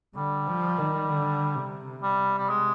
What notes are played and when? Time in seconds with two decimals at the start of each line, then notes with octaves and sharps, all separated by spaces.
0.15 D3 G3
0.47 F3
0.78 D#3
1.08 D3
1.55 C3
2.03 G3
2.38 G3
2.49 G#3